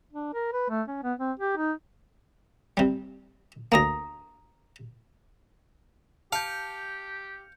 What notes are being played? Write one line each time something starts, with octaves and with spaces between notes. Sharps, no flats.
D4
A#4
B4
A3
C#4
B3
C4
G4
D#4
C3 G3
D2 A#3 A#5 D#6 A#6
G4 F5 A5 G6 C#7